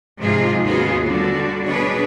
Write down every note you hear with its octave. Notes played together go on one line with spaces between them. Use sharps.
G#2 C3 F3 D#4 F4 G#4
D#2 C#3 B3 F4 F#4 G#4
D3 G3 F#4
B2 D4 G#4 B4 C#5